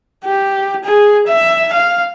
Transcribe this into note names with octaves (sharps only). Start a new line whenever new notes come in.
G4
G#4
E5
F5